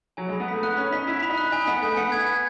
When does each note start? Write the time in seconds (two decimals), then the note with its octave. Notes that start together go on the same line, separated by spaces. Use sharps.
0.17 F#3 G#5
0.29 G#3 B5
0.40 B3
0.48 A3 B6
0.63 B3 F#6
0.77 C#4 B5
0.92 D#4 B6
1.07 E4 B6
1.23 B5
1.30 D#4
1.38 F#6
1.52 D#4 G#5
1.66 B3 B6
1.82 A3 G#5
1.97 B3 C#7
2.12 G#6
2.27 G#6